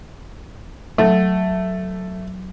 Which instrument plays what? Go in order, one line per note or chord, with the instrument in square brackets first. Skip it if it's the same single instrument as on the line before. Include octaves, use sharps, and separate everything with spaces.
[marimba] F#3 [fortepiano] A3